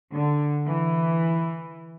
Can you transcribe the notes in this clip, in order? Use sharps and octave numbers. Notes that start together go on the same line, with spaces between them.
D3
E3